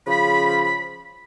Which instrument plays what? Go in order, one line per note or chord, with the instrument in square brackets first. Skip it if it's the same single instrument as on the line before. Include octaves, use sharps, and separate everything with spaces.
[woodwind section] C#3 F3 B5